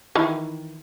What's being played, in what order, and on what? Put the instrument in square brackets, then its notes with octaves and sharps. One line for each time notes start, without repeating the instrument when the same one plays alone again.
[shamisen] D#3 E3